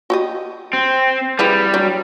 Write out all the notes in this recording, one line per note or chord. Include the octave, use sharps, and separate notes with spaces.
F#4 G4 D#5
C4
G3 E4 G#4 B4
F#3 D4